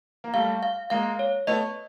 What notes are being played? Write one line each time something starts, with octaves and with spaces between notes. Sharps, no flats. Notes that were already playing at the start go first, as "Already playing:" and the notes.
A#3
G3 A3 F5
F5
G#3 A#3 F5
C#5
A3 B3 D#5